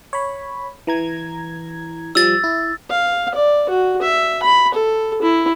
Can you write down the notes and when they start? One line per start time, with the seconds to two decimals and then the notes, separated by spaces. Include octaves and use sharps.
0.13 C#5 B5
0.87 E3 A#5 G#6
2.15 F3 G3 E6 A6
2.44 E4
2.90 F5
3.34 D5
3.69 F#4
4.02 E5
4.43 B5
4.74 A4
5.22 E4